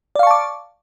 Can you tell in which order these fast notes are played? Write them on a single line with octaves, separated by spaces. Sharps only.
D5 F5 C#6 A5 D6